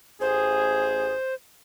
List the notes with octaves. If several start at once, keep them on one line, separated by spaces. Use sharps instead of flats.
A1 G#4 C5